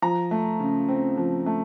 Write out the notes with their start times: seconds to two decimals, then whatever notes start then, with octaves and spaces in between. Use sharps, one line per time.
0.02 F3 A#5
0.31 A3
0.60 C#3
0.89 C4
1.17 F3
1.46 A3